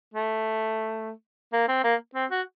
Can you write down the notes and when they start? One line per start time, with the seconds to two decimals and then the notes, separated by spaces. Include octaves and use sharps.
0.14 A3
1.53 A#3
1.69 C4
1.84 A#3
2.15 C4
2.31 F#4